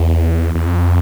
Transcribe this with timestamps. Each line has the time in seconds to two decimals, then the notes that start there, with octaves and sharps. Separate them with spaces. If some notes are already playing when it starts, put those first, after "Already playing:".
Already playing: E2
0.55 E2
0.67 F2